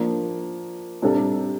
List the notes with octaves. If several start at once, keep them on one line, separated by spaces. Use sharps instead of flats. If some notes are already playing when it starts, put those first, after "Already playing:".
Already playing: F3 A#3 D4
C3 G3 D4 A4